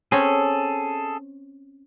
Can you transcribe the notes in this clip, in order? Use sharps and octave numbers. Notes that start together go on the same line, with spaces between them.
C4 C#4 G#4 A4